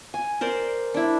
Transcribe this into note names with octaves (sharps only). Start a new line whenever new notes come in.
G#5
A#4 C5 D5
D4 E4